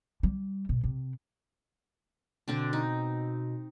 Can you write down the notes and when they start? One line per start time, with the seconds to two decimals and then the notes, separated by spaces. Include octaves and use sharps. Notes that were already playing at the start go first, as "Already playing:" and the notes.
0.23 G3
0.69 B2
0.83 C3
2.48 B2 D3 C4 D4
2.73 D#4